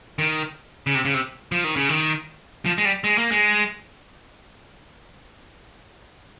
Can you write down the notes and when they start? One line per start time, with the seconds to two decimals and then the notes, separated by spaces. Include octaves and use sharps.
0.19 D#3
0.87 C#3
0.95 C3
1.05 C#3
1.14 C3
1.52 F3
1.64 D#3
1.76 C#3
1.89 D#3
2.66 F3
2.78 G#3
2.85 G3
3.04 G#3
3.18 A#3
3.31 G#3